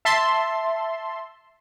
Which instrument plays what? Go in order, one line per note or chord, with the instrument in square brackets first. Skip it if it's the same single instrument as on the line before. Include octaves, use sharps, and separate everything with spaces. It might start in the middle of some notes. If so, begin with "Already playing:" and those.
[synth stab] E5 A5 C6